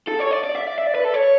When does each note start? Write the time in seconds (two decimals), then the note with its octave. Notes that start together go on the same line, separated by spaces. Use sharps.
0.08 A4
0.20 C#5
0.31 D5
0.44 D5
0.55 E5
0.67 D5
0.78 E5
0.87 D5
0.95 B4
1.04 A4
1.14 C#5